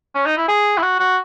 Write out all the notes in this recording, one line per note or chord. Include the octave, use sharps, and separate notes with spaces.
C#4
D#4
E4
G#4
E4
F#4
F#4